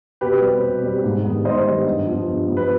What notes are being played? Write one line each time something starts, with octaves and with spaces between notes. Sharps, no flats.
B2 G4 B4
G3 C4
B2
G3 C4
G#2
D#3 G3 B3
G#2 C5 D#5
D#3 G3 B3
G2
F3 B3
G2
F3 B3
B4